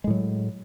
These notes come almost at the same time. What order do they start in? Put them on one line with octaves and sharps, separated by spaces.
G#3 A2 F#3